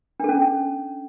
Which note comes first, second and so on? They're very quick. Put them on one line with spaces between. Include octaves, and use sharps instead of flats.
D4 A4 C#4